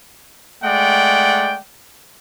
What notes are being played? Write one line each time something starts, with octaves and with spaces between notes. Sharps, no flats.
G#3 A3 D5 F#5 G5